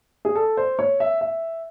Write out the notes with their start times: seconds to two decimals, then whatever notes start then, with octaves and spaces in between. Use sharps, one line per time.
0.25 G#4
0.35 A4
0.57 C5
0.79 C#5
1.00 E5
1.21 E5